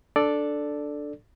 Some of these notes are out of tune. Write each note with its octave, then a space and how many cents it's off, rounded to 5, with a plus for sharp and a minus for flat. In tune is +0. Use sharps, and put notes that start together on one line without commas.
D4 +0 A4 +0 D5 +0